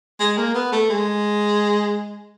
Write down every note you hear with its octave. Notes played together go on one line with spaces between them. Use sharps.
G#3
A#3
B3
A3
G#3